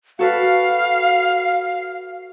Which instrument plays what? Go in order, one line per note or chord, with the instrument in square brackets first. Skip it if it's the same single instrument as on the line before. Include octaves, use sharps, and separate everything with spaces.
[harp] F#4 A4 B4 [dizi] F5